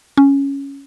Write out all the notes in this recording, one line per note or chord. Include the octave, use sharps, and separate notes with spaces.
C#4